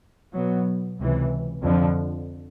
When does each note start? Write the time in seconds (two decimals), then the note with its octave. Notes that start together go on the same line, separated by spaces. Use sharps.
0.35 B2 F#3 B3
0.99 C#2 C3 E3
1.62 F2 D3 F3